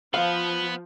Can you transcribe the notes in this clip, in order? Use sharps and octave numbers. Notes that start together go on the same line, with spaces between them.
F3 B3 F5